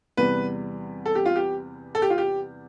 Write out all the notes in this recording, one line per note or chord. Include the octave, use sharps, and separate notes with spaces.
E2 C3 G3 B3 B4
A4
G4
F4
G4
A4
G4
F4
G4